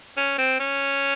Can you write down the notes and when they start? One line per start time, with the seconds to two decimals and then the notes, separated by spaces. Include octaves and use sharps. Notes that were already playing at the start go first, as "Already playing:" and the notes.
0.17 C#4
0.38 C4
0.60 C#4